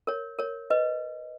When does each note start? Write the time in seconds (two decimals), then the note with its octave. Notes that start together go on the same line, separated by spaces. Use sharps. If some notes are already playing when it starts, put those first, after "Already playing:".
0.07 A#4 C#5
0.39 A#4 C#5
0.70 B4 D#5